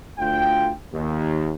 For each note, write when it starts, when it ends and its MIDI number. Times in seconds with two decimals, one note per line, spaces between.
0.19 0.71 38
0.19 0.71 65
0.19 0.71 79
0.93 1.53 39